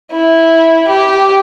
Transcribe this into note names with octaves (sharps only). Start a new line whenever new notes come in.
E4
G4